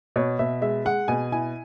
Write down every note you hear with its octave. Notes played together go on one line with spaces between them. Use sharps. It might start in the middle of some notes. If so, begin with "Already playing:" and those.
B2 C#5
B2 E5
G#3 E5
G#3 F#5
B2 G#5
E4 G#5